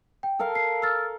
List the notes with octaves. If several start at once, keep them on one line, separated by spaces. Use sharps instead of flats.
G5
A4 A#4 F5
C7
E6 F6 A6